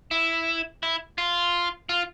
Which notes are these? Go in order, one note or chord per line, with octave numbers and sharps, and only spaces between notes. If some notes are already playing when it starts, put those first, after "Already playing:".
E4
E4
F4
F4